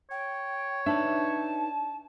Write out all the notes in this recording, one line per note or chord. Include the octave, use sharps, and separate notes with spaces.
C#5 G5
D4 D#4 B4 E5 A5